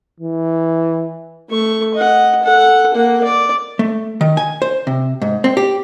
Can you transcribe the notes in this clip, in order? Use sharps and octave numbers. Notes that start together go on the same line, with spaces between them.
E3
A3 C#6
D#5 F#5
A4 F#5
A#3 F#5
D5
A3
D#3
G#5
C5
C3
G#2
C4
G4